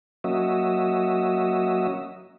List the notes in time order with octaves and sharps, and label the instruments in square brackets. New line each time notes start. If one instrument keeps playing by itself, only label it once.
[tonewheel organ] F#3 A#3 C#4 F#4 D#5 E5